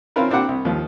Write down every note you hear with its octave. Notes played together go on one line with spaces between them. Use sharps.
C4 C#4 E4 F4 A#4 B4
A#3 C4 D4 E4 G4 F#5
C2
D#2 F3